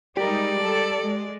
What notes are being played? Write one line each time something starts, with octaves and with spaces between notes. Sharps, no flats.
G3 G#3 D#4 G4 A#4 D5
G3 A4
G#3